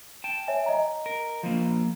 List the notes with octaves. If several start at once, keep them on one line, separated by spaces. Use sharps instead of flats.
G5 A5
C#5 E5 G#5
D#5 A#5
A#4
F3 A#3